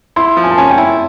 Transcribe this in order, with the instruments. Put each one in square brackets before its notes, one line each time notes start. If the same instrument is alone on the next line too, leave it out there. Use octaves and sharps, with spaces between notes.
[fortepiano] E4 [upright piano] C6
[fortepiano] F3
[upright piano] G#5
A5
[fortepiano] C#4 [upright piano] G#5
[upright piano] G5
[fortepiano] E4